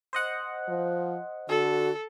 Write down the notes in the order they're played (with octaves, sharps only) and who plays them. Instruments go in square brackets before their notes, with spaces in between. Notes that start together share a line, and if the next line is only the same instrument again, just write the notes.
[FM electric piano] C5 D#5 F#5
[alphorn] F3
[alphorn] D3 [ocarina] F#4 [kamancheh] A4